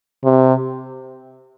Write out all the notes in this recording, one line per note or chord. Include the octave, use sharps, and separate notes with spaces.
C3